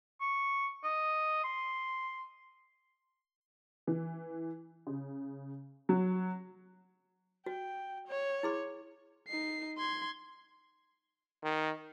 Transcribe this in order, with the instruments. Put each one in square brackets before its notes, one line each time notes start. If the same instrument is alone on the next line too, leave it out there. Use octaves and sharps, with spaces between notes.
[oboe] C#6
D#5
C6
[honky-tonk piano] E3
C#3
F#3
[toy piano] F#4 [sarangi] G5
[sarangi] C#5
[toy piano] E4 G#4 C6
[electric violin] D#4 C7
C6 G#6
[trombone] D#3